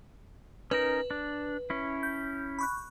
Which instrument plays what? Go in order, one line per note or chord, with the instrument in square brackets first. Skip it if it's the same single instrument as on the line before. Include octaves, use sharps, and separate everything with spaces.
[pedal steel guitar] C#4 D#4 A#4 [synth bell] B4
[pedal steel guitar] D4
C#4 E4
[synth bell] G6
B5 C#6 F#6